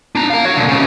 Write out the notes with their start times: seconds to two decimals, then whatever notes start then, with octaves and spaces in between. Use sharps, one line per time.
0.15 D4 A#5
0.30 F5 A#5
0.45 F#4 C#5
0.57 A#2 D3
0.68 G#2 C#3